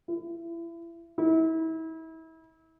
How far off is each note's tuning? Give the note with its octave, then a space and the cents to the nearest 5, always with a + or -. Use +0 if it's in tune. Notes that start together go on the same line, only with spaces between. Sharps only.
E4 +30
E4 -35